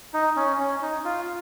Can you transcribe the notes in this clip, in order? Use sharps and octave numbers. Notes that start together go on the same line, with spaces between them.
D#4
C#4
C#4
D#4
F4